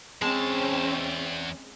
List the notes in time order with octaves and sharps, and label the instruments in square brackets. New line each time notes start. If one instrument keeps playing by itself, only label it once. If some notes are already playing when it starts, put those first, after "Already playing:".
[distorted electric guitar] E2 A5 [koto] G#3 [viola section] C4 C#4